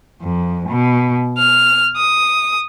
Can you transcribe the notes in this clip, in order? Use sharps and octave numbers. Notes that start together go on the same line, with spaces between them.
F2
B2
F6
D#6